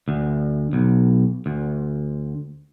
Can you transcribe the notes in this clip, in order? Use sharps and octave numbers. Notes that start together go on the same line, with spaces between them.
D2
B1
D2